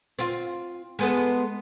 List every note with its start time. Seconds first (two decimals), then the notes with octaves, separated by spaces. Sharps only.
0.19 C4 F4
0.99 G#3 B3 A4